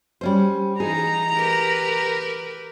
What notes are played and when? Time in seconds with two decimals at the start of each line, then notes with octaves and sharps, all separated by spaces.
0.21 G3 C#4 C5
0.80 E3 D#4 G#4 A#5
1.35 G4 A#4 B4